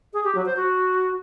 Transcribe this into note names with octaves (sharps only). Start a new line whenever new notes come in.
G#4
G4
F#3
C5
F#4